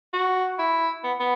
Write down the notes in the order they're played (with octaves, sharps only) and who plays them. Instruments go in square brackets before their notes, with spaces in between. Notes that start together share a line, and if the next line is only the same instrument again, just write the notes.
[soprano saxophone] F#4
E4
B3
B3